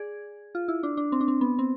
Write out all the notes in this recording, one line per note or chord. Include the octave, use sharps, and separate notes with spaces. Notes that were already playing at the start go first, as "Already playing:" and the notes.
Already playing: G#4 D5
F4
E4
D4
D4
C4
D4
C4
B3
C4